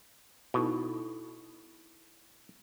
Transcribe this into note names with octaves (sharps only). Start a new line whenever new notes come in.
B2 D#4 E4 A4